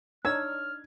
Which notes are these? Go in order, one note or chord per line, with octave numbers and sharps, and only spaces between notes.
D4 D#4 C#5 E6 F6 G#6